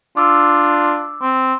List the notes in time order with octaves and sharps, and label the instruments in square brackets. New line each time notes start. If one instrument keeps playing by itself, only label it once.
[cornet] D4 [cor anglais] F4 [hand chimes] D6 E6
[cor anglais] C4